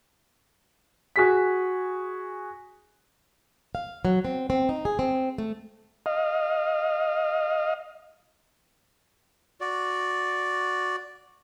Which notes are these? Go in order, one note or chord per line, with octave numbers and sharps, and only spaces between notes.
F#4 G#4 B6
F5
F#3
C4
C4
D#4
G#4
C4
A3
D#5 F5
F#4 D5